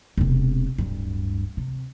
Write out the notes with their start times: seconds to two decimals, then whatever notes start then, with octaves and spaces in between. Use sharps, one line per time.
0.17 E1 C3
0.78 D1 G2
1.57 C3